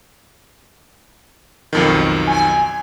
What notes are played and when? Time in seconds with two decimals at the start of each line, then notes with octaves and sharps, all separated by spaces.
1.73 B1 F2 D#3
2.27 G#5